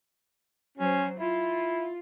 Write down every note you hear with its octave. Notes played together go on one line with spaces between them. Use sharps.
F#3 C#4 C5
E4 F4